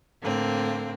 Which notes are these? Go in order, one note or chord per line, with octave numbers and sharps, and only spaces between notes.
A2 D3 A#3 C4